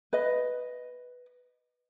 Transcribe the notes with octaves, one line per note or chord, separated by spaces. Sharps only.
B4 D#5